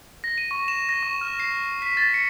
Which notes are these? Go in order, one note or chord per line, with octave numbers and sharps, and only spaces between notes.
A#6
D#7
C#6
E7
A#6
C#6
F6
C7
B6
A6
C#7